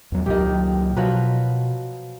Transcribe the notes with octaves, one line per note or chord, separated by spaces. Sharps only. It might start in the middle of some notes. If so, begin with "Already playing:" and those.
E2 F#3
C#2 A#2 D#3 F#3 G4
B2 F3 F#3 B4